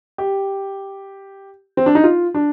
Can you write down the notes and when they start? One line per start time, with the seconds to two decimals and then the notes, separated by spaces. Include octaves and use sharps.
0.18 G4
1.77 C4
1.86 D4
1.95 D#4
2.04 F4
2.35 D4